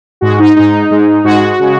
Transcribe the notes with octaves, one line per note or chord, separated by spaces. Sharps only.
G#2 G#3 F#4
D#4
G#2 G#3 D#4
G#2 G#3
G#2 G#3 F#4
C#3 G#3